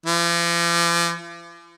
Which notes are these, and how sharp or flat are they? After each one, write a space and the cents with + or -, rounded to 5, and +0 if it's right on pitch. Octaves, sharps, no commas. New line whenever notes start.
F3 -45